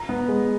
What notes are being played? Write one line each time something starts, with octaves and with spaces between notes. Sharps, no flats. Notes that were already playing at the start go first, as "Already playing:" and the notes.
Already playing: A#5
B3
G#3